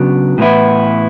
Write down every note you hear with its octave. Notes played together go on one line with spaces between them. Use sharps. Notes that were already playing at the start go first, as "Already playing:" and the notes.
Already playing: C#3 F#3 B3 D4
A2 E3 B3 E4